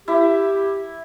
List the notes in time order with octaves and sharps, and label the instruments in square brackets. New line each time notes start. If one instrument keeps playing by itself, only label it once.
[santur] E4 [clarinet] G4